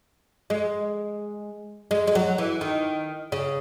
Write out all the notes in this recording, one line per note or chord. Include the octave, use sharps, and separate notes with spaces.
G#3
G#3
G#3
F#3
E3
D#3
C#3